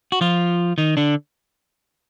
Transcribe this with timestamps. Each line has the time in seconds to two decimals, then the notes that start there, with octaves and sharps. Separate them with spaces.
0.12 F#4
0.21 F3 F4
0.78 D#3 D#4
0.97 D3 D4